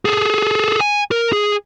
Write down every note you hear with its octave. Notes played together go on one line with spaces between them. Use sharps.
G#4 A4
G#5
A#4
G#4